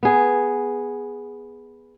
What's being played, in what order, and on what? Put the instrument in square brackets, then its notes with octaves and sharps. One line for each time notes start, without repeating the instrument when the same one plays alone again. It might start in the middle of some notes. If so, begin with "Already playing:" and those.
[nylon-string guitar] B3 G#4